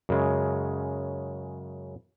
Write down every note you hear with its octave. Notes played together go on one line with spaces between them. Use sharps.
F#2 C#3 G#3